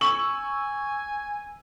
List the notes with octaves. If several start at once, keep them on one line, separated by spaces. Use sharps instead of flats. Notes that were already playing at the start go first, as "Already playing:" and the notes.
G#5 C#6 E6 F#7